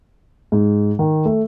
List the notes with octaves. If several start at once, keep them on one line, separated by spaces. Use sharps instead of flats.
G#2
D#3
A3